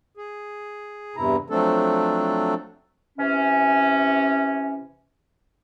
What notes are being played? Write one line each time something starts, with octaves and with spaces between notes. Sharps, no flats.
G#4
E2 G2 C3 E4 A#5
F3 F#3 A3 C4 D4 A4
C3 E3 C#4